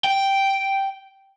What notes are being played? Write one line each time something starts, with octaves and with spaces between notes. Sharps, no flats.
G5